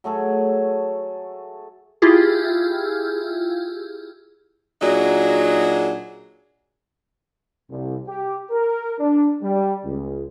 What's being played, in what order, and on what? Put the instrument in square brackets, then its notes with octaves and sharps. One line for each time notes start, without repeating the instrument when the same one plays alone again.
[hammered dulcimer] F#3 A3 G#4 A4
[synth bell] E4 F4 G4 G#4
[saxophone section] A#2 F#3 D4 D#4 F#4 G#4
[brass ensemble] C2
G4
A#4
D4
G3
C#2